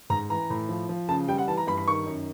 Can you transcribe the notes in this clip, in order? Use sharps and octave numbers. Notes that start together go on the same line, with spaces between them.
G#2 A#5
E3 A#5
A2
F3
F3
C#3 A5
G3 G5
F#5
E3 A5
A#5
G2 B5
B5
D#3 C#6
F#2